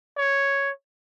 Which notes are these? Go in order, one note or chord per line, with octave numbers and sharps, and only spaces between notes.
C#5